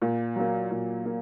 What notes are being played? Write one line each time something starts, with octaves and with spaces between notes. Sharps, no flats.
A#2
F#3 A#3
A#2
A#3